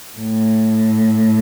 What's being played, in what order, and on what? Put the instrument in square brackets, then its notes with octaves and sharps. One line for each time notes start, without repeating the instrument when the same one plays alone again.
[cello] A2